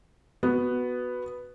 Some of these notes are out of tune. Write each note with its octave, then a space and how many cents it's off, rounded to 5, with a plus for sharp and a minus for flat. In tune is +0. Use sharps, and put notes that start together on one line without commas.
B3 +0 F#4 +0